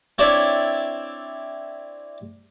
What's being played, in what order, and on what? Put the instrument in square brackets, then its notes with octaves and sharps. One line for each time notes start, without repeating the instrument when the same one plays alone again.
[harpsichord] C4 D4 E4 C#5 D5 E5